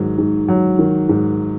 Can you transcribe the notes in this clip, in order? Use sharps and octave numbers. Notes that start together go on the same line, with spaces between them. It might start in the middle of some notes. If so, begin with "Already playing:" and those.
Already playing: G#2 D#3 F#3
G#2
F#3
D#3
G#2